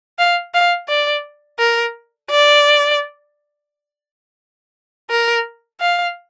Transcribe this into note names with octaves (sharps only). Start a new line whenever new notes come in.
F5
F5
D5
A#4
D5
A#4
F5